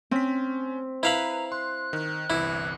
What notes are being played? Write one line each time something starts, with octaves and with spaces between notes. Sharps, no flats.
C4 C#4 B6
E4 B4 F5 A#5 B5
C6 F#6
D#3
G1 C2 E3 E4